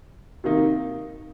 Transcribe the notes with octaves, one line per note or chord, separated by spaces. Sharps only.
C3 D#3 A#3 D#4 A#4